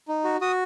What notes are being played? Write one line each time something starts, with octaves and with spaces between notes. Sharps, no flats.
D#4
F#4
F#4 D#6